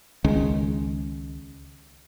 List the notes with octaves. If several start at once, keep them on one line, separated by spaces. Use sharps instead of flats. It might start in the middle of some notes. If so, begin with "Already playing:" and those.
C#2 D#3 G#3 C#4